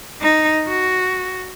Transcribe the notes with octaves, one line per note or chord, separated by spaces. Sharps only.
D#4
F#4